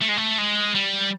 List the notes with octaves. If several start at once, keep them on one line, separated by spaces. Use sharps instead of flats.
A3
G#3
A3
G#3
G3